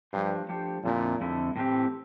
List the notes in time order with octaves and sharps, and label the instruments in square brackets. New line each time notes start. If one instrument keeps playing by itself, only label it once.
[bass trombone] G2 [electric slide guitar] F3 A3 D4 G4 C5
[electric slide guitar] F3 A3 D4 G4 C5
[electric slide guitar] F2 D3 A3 E4 [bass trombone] A#2
[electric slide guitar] F2 D3 A3 E4
A2 E3 G3 C4 G4